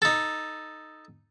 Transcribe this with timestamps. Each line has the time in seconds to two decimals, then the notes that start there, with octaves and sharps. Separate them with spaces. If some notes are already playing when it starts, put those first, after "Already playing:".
0.02 D#4 A4